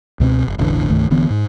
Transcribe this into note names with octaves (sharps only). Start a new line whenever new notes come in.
C#2 B2 C4
F#1
E1 A1 D3 E3
C2 G2 D#3 A3
D#1 D3 E3 B3
G#2